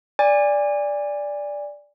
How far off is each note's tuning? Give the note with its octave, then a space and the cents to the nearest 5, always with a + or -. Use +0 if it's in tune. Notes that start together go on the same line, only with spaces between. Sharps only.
D5 -5 G#5 -30